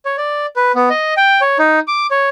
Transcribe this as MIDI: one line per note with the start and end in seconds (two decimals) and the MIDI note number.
0.05 0.16 73
0.17 0.46 74
0.56 0.72 71
0.75 0.89 59
0.90 1.14 75
1.17 1.41 79
1.41 1.58 73
1.59 1.80 63
1.88 2.07 86
2.11 2.29 73